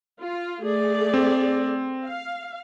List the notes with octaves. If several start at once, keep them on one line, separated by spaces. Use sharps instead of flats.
F4
A3 G#4 D5
C4
F5